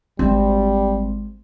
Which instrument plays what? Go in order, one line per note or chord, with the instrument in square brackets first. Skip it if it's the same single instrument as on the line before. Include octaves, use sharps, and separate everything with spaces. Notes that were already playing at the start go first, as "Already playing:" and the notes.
[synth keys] G#1 C4 [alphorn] G3 [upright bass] G#3